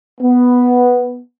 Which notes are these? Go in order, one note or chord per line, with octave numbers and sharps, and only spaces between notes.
B3